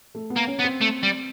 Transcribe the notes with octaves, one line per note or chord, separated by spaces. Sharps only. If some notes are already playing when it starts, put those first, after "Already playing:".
A3
B3
A#3
C#4
B3
C4
A3
G3